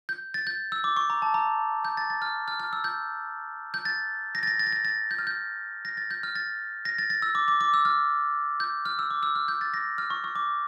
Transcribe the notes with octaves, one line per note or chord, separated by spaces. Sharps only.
G6
A6
G6
E6
D6
C#6
A#5
A5
A#5
G6
A6
A6
F6
F6
F6
E6
G6
G6
A6
A#6
A6
A#6
A6
A#6
A6
A6
G6
F6
G6
A#6
A6
G6
F6
A6
A#6
A6
A6
E6
D6
D6
D6
E6
F6
G6
F6
E6
D6
E6
F6
G6
A6
A#6
F6
C#6
C#6
D6